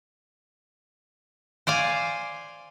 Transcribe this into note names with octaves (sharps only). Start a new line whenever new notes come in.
C5 D5 F5 G#5